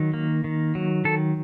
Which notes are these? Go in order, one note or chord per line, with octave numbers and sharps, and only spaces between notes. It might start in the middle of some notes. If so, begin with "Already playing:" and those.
Already playing: D#3 F#3
A#3
D#3
F#3
D#3 A4